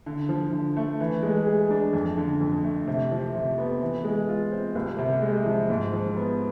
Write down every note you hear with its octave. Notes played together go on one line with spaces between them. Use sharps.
D3
F3
D3
A3
E3
G#3
G#4
D4
F2
D3
F2
A3
C3
F3
C3
B3
E3
G#3
F4
C4
C2
C3
G#3
F3
G#2
F3
B3